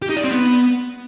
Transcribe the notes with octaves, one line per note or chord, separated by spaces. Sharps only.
G4
D#4
D5
C4
B3